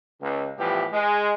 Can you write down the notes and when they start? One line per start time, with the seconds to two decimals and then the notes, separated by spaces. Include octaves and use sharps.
0.21 C#2
0.58 A2 E3 F3 G3 B3 G4
0.93 G#3